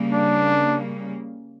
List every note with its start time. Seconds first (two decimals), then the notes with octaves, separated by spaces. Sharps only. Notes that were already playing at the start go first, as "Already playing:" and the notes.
Already playing: C#3 G3 A#3
0.12 D4